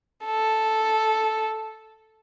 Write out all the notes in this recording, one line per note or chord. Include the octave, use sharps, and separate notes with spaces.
A4